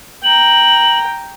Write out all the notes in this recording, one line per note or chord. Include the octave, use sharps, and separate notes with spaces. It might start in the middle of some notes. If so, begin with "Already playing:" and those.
G5 A#5 F#7